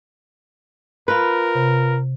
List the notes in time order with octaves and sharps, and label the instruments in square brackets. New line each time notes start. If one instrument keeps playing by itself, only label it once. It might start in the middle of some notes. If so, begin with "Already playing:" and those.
[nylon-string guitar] F4 B4 [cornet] A#4
[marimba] C3